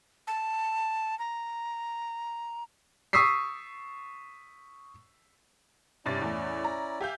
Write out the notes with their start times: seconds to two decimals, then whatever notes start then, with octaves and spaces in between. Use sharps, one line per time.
0.27 A5
1.19 A#5
3.13 C#6 D#6 E6 B6 C7
6.06 G2 C3 C#4 E4 D5 A6
6.21 E2 A2
6.64 A#5
7.00 G4 E5 F5 G#5 G6